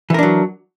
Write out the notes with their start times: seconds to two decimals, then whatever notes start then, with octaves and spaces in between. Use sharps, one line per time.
0.10 E3
0.14 A#4
0.19 D4
0.23 F#3